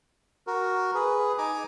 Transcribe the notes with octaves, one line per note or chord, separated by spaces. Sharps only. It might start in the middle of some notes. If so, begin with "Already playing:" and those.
F#4 A#4
G#4 B4
D#4 G#5 A#5 D6